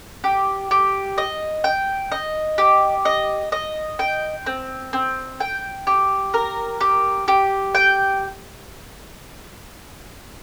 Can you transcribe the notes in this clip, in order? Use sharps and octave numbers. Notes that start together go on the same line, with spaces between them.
G4
G4
D#5
G5
D#5
G4
D#5
D#5
G5
C4
C4
G5
G4
A#4
G4
G4
G5